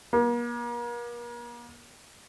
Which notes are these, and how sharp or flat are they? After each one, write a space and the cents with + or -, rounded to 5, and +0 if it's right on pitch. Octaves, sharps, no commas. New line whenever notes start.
A#3 +40